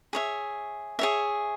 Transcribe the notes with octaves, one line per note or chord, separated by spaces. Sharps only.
G#4 C#5 E5
G#4 C#5 E5